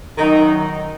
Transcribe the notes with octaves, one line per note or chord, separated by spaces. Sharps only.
F#2 D#3 F#3 D#4